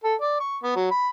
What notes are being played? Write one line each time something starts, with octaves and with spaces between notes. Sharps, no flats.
A4
D5
C#6
B3
F#3
B5